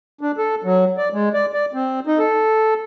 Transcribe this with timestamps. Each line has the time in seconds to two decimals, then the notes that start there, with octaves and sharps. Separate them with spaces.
0.21 D4
0.38 A4
0.64 F#3
0.97 D5
1.13 G#3
1.34 D5
1.53 D5
1.74 C4
2.07 D#4
2.19 A4